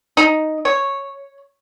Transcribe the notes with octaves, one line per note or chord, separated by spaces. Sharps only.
D#4
C#5